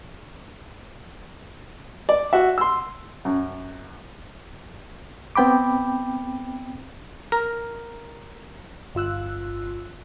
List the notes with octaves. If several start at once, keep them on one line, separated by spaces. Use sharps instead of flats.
D5
F#4 E5
C6 E6
F#2
B3 C4 G5 B5 D6
A#4
G1 F4 E6 F#6